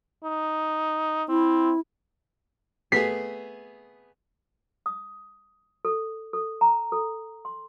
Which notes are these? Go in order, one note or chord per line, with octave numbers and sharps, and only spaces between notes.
D#4
C4 E4
A3 B3 G#4 B6 C7
D#6
A4
A4
A#5
A4
C6